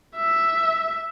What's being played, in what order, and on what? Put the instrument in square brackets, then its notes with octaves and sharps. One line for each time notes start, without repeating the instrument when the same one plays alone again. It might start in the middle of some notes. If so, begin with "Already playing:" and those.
[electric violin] E5